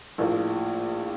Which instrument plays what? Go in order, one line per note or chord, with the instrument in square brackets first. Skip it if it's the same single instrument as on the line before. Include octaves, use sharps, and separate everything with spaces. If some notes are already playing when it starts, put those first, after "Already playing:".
[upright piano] A#1 A2 F3 A#3 F4